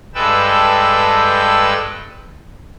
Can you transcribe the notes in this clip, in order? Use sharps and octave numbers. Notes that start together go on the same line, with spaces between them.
G2 G#3 A4 B4 G5 E6